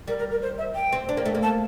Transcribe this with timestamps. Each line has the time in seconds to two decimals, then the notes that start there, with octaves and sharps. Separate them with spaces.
0.08 G3 A#4
0.19 A#4
0.31 A#4
0.42 C5
0.58 E5
0.75 G5
0.93 C4
1.09 D4
1.17 A#3
1.26 A3
1.35 A#3
1.43 A5